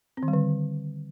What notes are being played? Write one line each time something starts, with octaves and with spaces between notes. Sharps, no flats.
C4
D#3
G3
D3